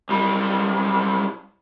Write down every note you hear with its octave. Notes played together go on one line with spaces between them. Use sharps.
B1 G3